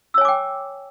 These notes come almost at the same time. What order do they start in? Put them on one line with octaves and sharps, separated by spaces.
E6 C#5 G#5 D6 G5